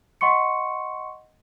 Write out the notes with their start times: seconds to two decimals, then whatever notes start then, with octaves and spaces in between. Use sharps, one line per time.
0.21 D#5 F#5 C6 C#6 C#7